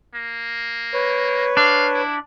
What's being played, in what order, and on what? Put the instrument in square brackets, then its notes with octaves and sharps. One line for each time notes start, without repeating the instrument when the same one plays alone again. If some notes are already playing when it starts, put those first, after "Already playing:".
[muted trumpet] A#3
[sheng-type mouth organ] B4 C#5
[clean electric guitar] D4 [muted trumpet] F5
[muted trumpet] E4